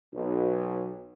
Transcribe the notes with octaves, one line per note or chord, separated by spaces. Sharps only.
B1